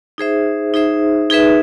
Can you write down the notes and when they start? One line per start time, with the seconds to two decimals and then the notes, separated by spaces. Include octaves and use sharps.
0.18 D#4 G#4 C5 E5
0.74 D#4 G#4 C5 E5
1.30 D#4 G#4 B4 E5